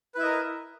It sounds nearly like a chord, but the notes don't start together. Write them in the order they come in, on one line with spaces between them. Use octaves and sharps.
B4 E4 E5 D#5 A#4